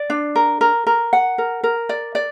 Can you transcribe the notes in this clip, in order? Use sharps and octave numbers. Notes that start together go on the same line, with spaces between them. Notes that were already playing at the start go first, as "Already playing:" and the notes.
Already playing: D5
D4
A#4
A#4
A#4
F#5
A#4
A#4
D5
D5